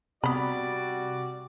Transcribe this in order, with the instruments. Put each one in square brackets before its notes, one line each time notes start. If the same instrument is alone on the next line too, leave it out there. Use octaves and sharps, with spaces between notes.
[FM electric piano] C3 [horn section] G3 F#4 D5 [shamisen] B3 B5